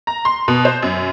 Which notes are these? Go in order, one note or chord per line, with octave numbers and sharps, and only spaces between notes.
A#5
C6
B2
C5
F#2